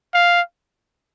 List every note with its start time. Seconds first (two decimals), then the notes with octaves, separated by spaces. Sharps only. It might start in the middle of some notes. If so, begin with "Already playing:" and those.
0.14 F5